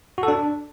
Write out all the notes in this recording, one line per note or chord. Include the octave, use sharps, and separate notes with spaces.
F#4
A4
D4